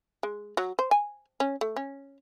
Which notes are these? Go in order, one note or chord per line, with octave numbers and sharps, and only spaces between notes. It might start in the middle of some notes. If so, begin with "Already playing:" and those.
G#3
F#3
C5
G#5
C#4
A3
C#4